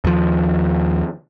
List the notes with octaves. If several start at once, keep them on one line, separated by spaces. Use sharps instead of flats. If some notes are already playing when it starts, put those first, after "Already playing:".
D#2 F3